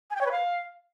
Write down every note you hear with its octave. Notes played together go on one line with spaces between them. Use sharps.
G#5
G5
C#5
B4
F5